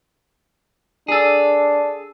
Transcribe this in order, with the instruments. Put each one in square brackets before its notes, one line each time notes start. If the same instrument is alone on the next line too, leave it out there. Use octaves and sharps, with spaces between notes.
[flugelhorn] D4 [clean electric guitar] G#4 A4